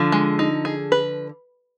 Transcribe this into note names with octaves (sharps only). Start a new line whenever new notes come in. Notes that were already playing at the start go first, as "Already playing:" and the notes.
Already playing: D3 F3
G#3
D#4
G#4
B4